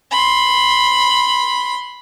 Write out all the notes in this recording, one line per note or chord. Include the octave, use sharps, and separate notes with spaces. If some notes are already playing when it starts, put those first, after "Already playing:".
B5 C6